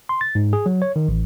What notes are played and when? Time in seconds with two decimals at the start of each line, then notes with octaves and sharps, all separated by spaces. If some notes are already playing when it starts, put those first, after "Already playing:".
0.09 C6
0.21 A6
0.35 G#2
0.53 G#4
0.66 F#3
0.82 C#5
0.96 D#3
1.08 A1